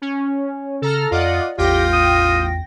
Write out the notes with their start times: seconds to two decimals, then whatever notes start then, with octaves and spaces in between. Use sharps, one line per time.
0.02 C#4
0.82 C#3 A4 A#5 F6
1.11 F2 F4 D5 D#5 F#5
1.58 A1 E2 F4 G4 G5 A#6
1.93 D#6